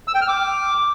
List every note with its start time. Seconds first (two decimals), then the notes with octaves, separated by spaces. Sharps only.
0.08 E6
0.15 G5
0.21 F6
0.28 D6